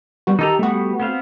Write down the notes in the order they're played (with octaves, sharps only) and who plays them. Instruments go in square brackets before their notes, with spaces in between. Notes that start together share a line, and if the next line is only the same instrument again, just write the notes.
[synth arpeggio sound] G3 B3 F#4
[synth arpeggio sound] D#3 G4 [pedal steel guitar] D#4 A4 A#5
[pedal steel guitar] G3 B3 [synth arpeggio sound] A3 F#4
[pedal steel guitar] B3 C4 F5